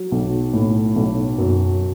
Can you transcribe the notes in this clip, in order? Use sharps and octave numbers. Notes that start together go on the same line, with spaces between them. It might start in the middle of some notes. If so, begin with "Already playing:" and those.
Already playing: F#3
B1
A2
B1
F#2